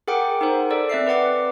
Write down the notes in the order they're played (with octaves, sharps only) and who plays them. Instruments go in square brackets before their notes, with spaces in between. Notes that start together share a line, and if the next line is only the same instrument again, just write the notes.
[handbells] G#4 A#4 F#5 G5 D6
D#4 A#4 C5
A4 D5
C4 D5 E5 C7
B4 D5 F#5 D6